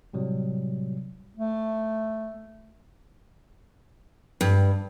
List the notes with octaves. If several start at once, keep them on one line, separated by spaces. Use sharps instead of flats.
A2 C3 F#3 G3
A3
G2